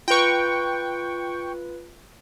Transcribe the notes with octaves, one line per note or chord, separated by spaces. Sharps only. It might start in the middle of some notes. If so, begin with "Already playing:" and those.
F4 B4 G5 C#6